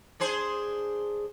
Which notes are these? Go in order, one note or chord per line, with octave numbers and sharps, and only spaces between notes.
D4 G#4 C5